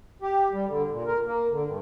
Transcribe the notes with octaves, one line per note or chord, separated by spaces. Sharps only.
G4
G3
D3
A#2
A#4
A#3
D3
G2